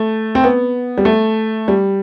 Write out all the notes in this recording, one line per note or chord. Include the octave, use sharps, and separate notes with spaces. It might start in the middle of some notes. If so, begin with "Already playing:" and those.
Already playing: A3
C4
B3
G3
A3
G3